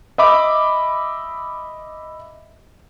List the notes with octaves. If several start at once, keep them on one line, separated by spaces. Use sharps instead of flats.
D#5 E5 B5 D6